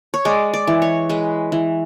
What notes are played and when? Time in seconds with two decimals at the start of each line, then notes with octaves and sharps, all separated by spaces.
0.14 C#5
0.25 G#3 D5
0.54 D5
0.67 E3
0.82 C#5
1.09 G#3 B4
1.52 E3